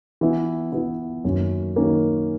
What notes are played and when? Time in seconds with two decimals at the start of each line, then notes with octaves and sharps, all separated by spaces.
0.21 E3 B3 E4
0.72 E3 B3 E4
1.24 F#2 D#3 A#3 C#4
1.76 D#3 A#3 C#4